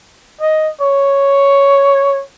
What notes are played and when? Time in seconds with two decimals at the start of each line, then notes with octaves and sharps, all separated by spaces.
0.41 D#5
0.81 C#5